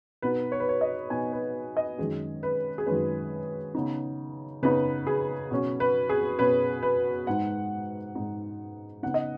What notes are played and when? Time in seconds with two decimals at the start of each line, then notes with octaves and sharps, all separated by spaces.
0.22 B2 B3 D#4 B4
0.52 C#5
0.60 B4
0.69 C#5
0.81 D#5
1.10 B2 B3 D#4 G#5
1.33 B4
1.77 D#5
1.98 F#2 D#3 G#3 C#4 G#4
2.43 B4
2.78 G#4
2.86 F#2 D#3 G#3 C#4 B4
3.75 C#3 B3 D#4
4.63 C#3 B3 D#4 B4
5.07 G#4
5.51 B2 F#3 C#4
5.80 B4
6.09 G#4
6.39 B2 F#3 C#4 B4
6.83 B4
7.27 G#2 G#3 D#4 F#5
8.15 G#2 G#3 D#4
9.03 C#3 B3 D#4 F#5
9.14 D#5